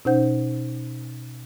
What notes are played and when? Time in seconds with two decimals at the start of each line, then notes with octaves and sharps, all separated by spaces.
0.05 B2 C#4 D#4 C5 F#5 G6